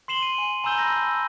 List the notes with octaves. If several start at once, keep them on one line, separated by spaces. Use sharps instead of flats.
C6 C7 E7 F#7 G7
D#7
G#5
G#5 A#5 B5 E6 G6 G7
A5 B5 A#6
E6